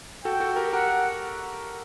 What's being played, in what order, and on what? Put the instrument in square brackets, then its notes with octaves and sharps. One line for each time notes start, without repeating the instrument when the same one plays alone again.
[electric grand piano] F#4 A4 [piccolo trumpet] G5
[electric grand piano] F#4 A4
G4 A#4
[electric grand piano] G4 A#4 [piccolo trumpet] F#5